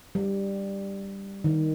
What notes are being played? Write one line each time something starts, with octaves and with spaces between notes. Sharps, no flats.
G3
D#3